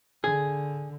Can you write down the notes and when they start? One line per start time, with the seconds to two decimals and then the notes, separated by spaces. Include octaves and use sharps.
0.24 D3 G#4